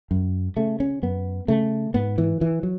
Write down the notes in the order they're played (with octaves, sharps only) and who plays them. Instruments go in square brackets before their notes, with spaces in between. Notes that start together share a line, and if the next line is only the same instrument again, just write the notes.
[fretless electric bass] F#2
C#3 A3
C#4
F#2 B3
C#3 A3
G#2 B3
E3
E3
F#3